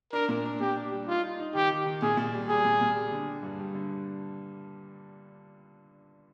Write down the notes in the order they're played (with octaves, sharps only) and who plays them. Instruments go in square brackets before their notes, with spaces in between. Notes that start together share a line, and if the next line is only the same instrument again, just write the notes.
[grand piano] D4 [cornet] A#4
[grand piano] A#2
D4
[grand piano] A#2 [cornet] G4
[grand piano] D4
G3
[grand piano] D#4 [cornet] F4
[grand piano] D#4
D#4
[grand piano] D#3 [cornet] G4
[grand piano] D#3
D#3
[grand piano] A#2 [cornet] G#4
[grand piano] A#2
G3
[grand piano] G3 [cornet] G#4
[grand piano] A#2
A#2
G3
D3
G3
G2
G3
D3